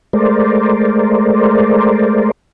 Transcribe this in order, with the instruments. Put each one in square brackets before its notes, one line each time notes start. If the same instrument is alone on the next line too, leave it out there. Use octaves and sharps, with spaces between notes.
[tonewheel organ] G#3 A3 A#4 C5 D5